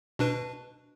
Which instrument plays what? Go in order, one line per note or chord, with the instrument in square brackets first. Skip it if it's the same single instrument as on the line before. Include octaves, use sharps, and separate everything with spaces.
[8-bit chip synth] B2 D4 B4